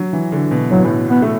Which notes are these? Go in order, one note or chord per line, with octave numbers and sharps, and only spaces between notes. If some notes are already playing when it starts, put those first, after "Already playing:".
Already playing: F#3
E3
D3
B2
A2 F#3
B2
A2
B3
A3